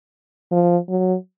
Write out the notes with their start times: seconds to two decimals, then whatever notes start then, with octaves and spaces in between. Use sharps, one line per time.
0.52 F3
0.89 F#3